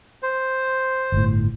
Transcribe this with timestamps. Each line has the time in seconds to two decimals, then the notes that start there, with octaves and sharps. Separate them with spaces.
0.23 C5
1.12 G1 A2